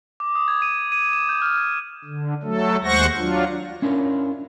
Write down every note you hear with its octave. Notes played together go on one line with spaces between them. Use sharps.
D6
D#6
G#6
D#7
D#7
E7
G6
F6
G#6
D3
F#3 A3 A4
D#2 G#3 C5 F#5 C#6 A#6
F#3 D4 F4
C#4 D4 E4 F4 A#4 C#5